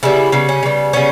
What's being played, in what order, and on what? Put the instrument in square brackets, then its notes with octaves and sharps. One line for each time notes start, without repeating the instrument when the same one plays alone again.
[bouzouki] C#3 G3 B3 E4
C#3 G3 B3
C#4
C#3 G3 B3
C#3 G3 B3 C#4